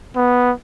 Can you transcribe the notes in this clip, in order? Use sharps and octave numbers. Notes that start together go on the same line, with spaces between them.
B3